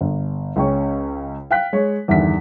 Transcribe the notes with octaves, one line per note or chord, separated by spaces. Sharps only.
G1
C#2 C#3 C#4 G5 C#6
F5 G5 F#6 B6
G#3 C#5
E2 G2 D3 D#3 E5 B6